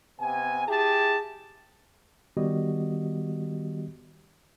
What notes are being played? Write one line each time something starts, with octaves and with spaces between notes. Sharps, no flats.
C3 B3 G#5
E4 G4 G#4 G#5 A5
D#3 G3 B3 F#4 G4 D#5